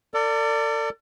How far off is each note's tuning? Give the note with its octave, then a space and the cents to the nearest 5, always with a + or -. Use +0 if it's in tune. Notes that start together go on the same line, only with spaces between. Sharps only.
A4 +45 D5 +0